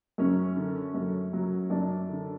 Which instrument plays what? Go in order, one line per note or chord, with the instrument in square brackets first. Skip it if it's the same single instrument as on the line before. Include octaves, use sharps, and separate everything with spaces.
[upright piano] F#2 C#4
D3
F#2
F#3
F#2 D4
D3